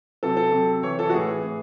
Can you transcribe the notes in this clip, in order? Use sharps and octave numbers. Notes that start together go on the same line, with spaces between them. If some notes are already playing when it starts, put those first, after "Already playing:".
C3 F#3 A4
A4
C3 F#3
C3 E3 C#5
A4
F#4
A2 E3 G#4
A2 E3